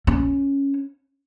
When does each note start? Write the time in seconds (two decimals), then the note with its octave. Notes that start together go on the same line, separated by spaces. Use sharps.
0.07 C#4